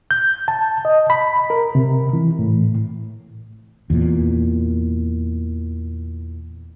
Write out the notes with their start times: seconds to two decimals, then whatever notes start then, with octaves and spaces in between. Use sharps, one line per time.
0.11 G6
0.48 A5
0.85 D#5
1.10 B5
1.50 A#4
1.75 C3
2.13 E3
2.39 A2
3.90 E2 A#2